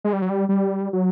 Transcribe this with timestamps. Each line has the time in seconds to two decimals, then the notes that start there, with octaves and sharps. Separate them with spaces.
0.04 G#3
0.13 G3
0.22 F#3
0.30 G3
0.49 G3
0.93 F#3